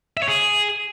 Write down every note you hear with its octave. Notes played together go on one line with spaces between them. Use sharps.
E5
C#5
G#4